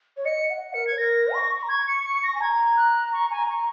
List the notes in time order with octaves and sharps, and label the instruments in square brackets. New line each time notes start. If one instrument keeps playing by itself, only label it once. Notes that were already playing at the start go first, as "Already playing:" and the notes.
[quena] C#5
[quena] D#5 [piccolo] C#7
[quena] F#5
[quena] A#4 [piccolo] C#7
[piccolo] G#6
[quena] C#5
[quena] A#4 [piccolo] A#6
[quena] C#6
A#5
[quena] C#6 [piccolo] G#6
[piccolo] C#7
C#7
A#6
[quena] G#5
[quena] A#5 [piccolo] G#6
[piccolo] F#6
C#6
G#5
C#6